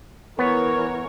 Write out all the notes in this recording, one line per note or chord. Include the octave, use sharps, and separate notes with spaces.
E3 B3 A#4 C#5